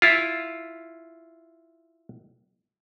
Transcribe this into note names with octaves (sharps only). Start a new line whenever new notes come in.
E4 F4